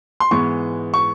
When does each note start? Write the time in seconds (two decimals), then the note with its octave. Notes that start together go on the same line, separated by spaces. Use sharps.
0.20 C6
0.31 G#2 E3 G#3 B3 C#6
0.94 C#6